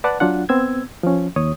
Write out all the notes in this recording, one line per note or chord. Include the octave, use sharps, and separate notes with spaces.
B4 D5 F#5 A5
F#3 D4 F4 F#5
B3 C4 E6 G#6
F3 C#4
D#2 C#5 D#6